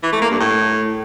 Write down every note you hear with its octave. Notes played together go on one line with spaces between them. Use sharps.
E3
A3
A#3
G2
A2